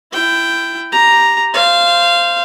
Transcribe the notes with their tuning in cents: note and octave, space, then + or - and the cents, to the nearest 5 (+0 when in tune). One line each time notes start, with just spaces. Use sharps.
E4 +25 G5 +0
G4 +0 A#5 +0
C5 -5 F5 -15